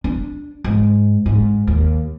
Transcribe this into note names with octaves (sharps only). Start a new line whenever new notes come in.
D4
G#2
G#2
D#2